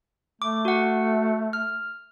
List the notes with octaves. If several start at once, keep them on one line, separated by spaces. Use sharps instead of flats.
A3 D6
F#4 F#5
F6